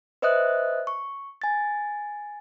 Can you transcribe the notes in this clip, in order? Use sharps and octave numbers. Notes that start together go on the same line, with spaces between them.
B4 C5 D#5 E5 D#6 F#6
C#6
G#5 A6